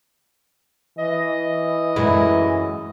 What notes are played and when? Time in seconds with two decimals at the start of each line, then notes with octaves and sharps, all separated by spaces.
0.99 E3 D#5
1.96 F#2 G#3 E4